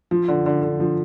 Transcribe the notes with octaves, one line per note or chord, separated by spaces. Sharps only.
F3
D3
D3
D3
F3